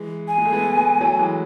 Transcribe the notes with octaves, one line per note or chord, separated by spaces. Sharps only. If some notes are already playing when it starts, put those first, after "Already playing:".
Already playing: E3 G#3
G#5
G#3
A3
G#3 B3
G#3 B3
F#3 A3
E3 G#3